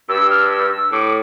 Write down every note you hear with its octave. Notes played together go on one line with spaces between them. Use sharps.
G2 E6
F6
E6
E6
A2 D6